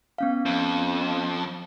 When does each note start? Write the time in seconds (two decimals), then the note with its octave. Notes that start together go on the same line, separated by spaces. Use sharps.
0.18 B3 C#4 F5
0.46 F2